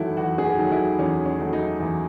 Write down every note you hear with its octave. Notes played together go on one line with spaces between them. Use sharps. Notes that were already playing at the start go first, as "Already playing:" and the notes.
Already playing: E2 D#3 F#3 A3 E4 F#4
E2 F#4
G#4
F#4
D#3 F#3 A3
E4
E2 C#4
C#4
D#3 F#3 A3
D#4
E2